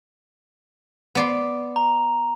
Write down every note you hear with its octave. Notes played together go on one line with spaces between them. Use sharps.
B3 D5 C6
A#5